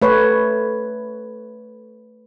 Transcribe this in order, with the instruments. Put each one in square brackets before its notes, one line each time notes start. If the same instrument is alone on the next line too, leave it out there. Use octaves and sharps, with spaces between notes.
[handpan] A3 B4 C#5